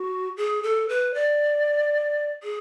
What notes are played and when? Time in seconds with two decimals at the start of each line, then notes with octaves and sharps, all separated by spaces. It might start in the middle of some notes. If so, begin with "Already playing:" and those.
Already playing: F#4
0.37 G#4
0.63 A4
0.89 B4
1.14 D5
2.43 G#4